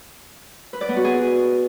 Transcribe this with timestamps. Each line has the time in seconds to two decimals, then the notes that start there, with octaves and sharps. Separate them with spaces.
0.73 B4
0.81 D5
0.89 B3
0.97 F#4
1.04 G#4